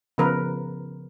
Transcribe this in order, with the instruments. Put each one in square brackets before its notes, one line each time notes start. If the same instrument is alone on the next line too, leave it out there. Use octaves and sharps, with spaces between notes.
[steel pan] C#3 F3 B3 A#4 B4